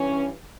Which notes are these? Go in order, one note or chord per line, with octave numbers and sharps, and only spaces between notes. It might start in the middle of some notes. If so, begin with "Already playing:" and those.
Already playing: G2 E3 C#4